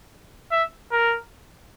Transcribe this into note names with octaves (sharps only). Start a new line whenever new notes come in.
E5
A#4